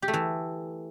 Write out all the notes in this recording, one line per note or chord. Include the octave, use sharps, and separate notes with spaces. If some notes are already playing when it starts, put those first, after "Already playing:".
G4
A3
E3